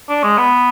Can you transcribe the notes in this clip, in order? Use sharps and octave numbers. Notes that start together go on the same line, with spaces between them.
D4
G#3
B3